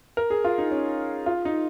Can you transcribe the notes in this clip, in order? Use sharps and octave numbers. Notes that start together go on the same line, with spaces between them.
A#4
G#4
F4
D#4
C#4
F4
D#4